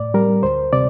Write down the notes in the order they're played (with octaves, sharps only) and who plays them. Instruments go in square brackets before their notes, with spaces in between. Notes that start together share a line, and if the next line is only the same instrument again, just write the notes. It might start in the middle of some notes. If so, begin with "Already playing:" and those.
Already playing: [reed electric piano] A2 D5
G3 A#4
D2 C5
C3 D5